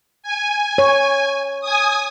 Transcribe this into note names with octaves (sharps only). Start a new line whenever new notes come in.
G#5
C#5
G#5 D#6